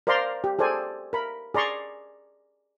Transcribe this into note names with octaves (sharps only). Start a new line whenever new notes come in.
A#4 C5 D5 F5 A#5 C6
G4
G#4 A4 C5 D5 G#5
A#4 B5
G#4 D5 A#5 C6 C#6